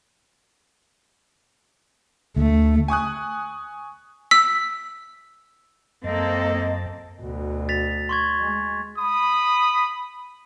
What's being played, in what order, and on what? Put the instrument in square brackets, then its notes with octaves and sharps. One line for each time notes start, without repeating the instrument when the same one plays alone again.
[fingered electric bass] D2 [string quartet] A3
[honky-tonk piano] G#5 C#6 D#6 F#6
[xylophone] E6 B6
[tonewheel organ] F#2 A5 [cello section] A#3 C4 [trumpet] A4 [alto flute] D#5
[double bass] D2 B2
[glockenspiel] A6 B6 F7
C6 C#6 G#6
[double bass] G#3
[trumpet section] B5 D#6